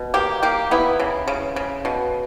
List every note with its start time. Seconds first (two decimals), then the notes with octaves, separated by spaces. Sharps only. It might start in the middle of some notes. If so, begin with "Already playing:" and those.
Already playing: B2
0.14 A#3 G4
0.43 A#3 G4
0.71 B3 E4
0.99 C#3
1.28 C#3
1.56 C#3
1.85 B2